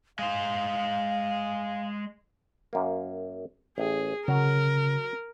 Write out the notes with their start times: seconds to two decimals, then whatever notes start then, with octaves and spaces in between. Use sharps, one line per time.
0.19 G#3 C5 F5
2.73 F#2 A#3
3.78 A1 G#4
4.28 C#3 F#3 A#4 A#5